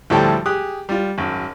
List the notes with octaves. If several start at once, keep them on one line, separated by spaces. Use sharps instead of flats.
D2 A2 F3 G3 A4 G5
G4 G#4 D#6 F#6
G3 F4
G#1 F#2